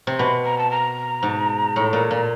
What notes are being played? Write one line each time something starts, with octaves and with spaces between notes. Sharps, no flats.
C3
B2 B5
A#5
A5
A#5
G#2
A2
A#2
A#2